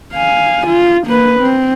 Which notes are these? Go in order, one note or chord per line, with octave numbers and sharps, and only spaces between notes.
F5 G#5
F4
A#3 B4
C4